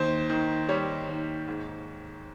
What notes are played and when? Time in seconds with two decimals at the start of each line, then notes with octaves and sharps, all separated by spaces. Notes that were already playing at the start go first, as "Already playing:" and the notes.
Already playing: D#2 C5
0.30 D#3
0.69 G3 C#5
1.08 D#2
1.48 G#2